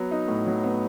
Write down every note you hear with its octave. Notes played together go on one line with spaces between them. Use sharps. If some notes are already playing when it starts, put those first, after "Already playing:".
Already playing: F#3 B3
D#4
A2
F#3
B3